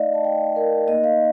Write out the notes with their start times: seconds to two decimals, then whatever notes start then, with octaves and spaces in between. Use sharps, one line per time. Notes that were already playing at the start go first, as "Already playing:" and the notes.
Already playing: A3 D#4 D5 D#5 F5
0.14 A5
0.24 G5
0.56 A#4
0.88 A#3 D#4 D#5
1.04 F5